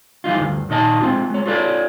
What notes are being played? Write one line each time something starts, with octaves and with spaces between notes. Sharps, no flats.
E3 G3 D#4 F4
D2 G2
D#2 A#2 D#4 D#5 A5
G#3 C4 F4
G#3 C#5
F4 A4 B4 C#5 D5